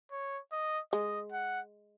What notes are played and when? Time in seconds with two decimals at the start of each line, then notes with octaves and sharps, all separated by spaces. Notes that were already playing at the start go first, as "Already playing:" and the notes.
0.12 C#5
0.52 D#5
0.92 G#3 D#5
1.32 F#5